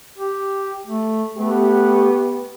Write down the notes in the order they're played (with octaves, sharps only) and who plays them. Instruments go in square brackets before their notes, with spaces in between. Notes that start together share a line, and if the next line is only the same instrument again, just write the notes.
[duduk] G4
A3
[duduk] A3 [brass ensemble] B3 G4